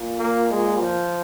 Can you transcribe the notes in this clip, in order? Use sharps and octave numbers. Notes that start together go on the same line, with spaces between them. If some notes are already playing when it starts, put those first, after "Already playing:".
Already playing: A#2
A#3
G#3
F3